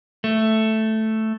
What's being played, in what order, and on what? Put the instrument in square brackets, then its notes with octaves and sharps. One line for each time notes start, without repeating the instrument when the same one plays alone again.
[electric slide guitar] A3